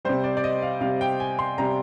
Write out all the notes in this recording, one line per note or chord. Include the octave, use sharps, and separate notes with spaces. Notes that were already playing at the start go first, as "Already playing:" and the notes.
C3 G3 C5
D5
D5
D#5
F5
C3 G3 F5
G5
G#5
C6
C3 G3 A#5